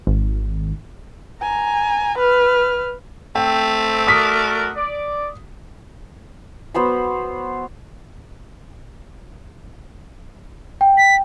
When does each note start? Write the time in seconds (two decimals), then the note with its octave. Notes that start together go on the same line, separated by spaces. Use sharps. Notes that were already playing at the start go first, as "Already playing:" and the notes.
0.07 G#1
1.41 G#5 A#5
2.18 B4 F6
3.35 A3 C4 G5
4.07 F#4 A#4 D5 D#6 B6
4.76 D5
6.74 F#3 B3 C5 B5
10.81 G5
10.98 B6